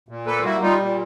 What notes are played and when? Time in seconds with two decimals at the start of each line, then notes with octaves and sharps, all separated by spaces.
0.09 A#2
0.27 A#3 A4 B4
0.38 F4
0.44 G3 E4 F#4
0.61 G3 D#4 F4
0.80 A#2